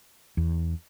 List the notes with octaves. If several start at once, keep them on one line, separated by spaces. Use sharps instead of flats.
E2